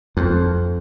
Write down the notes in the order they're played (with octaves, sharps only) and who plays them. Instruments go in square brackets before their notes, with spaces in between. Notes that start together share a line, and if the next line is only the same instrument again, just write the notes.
[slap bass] F2